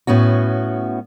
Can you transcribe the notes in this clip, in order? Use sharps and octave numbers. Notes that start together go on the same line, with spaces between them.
A2 B3 C#4 F#4